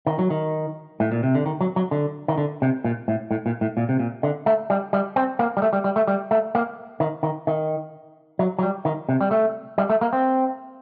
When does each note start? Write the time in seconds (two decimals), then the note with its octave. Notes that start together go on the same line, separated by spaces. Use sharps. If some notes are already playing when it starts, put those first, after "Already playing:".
0.07 D#3
0.19 F#3
0.30 D#3
1.00 A2
1.12 A#2
1.23 C3
1.35 D3
1.46 D#3
1.61 F#3
1.76 F#3
1.91 D3
2.28 D#3
2.38 D3
2.62 C3
2.84 A#2
3.08 A2
3.31 A2
3.46 A#2
3.61 A2
3.77 A#2
3.89 C3
3.99 A#2
4.23 D3
4.46 A3
4.70 G3
4.93 G3
5.16 C4
5.39 A#3
5.57 G3
5.62 A3
5.73 G3
5.84 G3
5.96 A3
6.07 G3
6.31 A3
6.55 A#3
7.00 D#3
7.23 D#3
7.47 D#3
8.39 F#3
8.59 F#3
8.63 G3
8.85 D#3
9.09 C3
9.21 G3
9.31 A3
9.78 G3
9.90 A3
10.01 A#3
10.13 C4